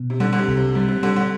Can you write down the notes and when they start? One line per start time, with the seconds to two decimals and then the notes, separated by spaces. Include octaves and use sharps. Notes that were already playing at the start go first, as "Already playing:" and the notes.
Already playing: B2
0.10 C3
0.20 D3 G3
0.33 D3
0.39 C3
0.48 C2
0.57 C3
0.75 C3 G3
0.88 C3
1.02 D3 G3
1.16 D3